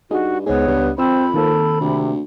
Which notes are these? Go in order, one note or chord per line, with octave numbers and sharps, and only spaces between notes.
G2 D#4 F#4 G#4
C#2 G#2 B3 G#4 C#5
C#2 G2
F2 C4 C5 B5 E6
D#3 A#3 C4 A4
D2 C3